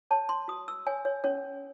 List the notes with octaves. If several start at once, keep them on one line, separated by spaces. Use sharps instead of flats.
C#5 A5
C6
F#4 D#6
E6
C#5 G#5
C#5
C#4 C#5